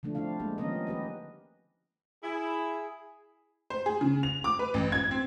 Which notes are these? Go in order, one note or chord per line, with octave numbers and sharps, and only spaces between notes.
D3 F3 A3 D4
C4 D4 E4 F5
G#3 A#3 G4
D#3 F3 B3 C#4 A#4 D#5
G4 B4 D#5
E4 G#4
C5
G#4
C#3
F7
D6
B4
A1
G#6
C4